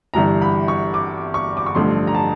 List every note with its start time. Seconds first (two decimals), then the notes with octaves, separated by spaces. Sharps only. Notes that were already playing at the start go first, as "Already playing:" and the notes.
0.14 G1 G2 E3 A#5
0.42 B5
0.68 C#6
0.94 D6
1.34 C#6
1.57 D6
1.66 C#6
1.75 A1 G2 D3 F3 C6
2.07 A#5
2.15 A5